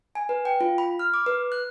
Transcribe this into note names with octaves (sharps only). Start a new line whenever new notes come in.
G#5
B4
G5
F4
B5
F6
D6
B4
F#6